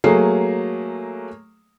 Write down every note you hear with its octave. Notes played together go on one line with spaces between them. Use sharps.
F#3 A3 A#3 G#4 C7